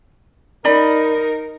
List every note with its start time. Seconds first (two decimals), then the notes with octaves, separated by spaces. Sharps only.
0.65 D#4 A#4 D5 B5